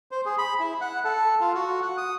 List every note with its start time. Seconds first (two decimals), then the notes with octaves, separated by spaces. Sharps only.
0.11 C5
0.26 G#4
0.38 B5
0.60 E4
0.81 F#5
1.04 A4
1.40 F4
1.55 F#4
1.82 F#5
1.97 D#6